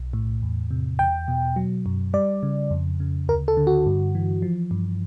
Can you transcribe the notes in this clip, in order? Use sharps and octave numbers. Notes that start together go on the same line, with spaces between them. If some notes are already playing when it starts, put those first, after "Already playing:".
Already playing: B1
A2
E2
C3
E2 G5
B2
F#3
F#2
G3 D5
C#3
F2
C#3
D2 A#4
A4
D3
F#4
G2
E3
F3
G2